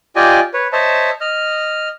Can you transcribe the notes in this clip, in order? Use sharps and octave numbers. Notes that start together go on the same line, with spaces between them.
F4 G4 D5 D#5 G5 G#5
B4 C#5
C5 C#5 D#5 E5 A5
D#5 F6